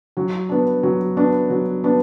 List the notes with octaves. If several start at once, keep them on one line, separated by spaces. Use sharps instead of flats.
F#3
B3 D4
F#3
B3 D4
F#3
B3 D4